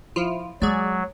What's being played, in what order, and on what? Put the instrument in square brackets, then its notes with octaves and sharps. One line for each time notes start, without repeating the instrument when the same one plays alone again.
[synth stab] F3 E4 F4
[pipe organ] F#3 [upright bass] G#3 [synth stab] G#4 D5